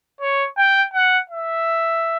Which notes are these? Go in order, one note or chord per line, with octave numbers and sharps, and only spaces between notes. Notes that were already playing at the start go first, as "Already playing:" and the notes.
C#5
G5
F#5
E5